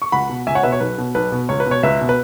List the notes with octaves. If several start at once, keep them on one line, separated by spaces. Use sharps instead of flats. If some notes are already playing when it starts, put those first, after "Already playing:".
C#6
C#2 F#5 B5
B2
C#2 E5 G#5
C#5 F#5
B2 B4 E5
C#5
B1 B4
B2
B1 B4
B2
C#2 C#5
B4
B2
C#5
C#2 B4 E5
B2
B4